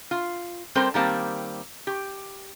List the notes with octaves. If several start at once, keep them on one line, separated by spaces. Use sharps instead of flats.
F4
G3 C4 A4 A#4 C5
D#3 G3 A#3 C4 A5
G4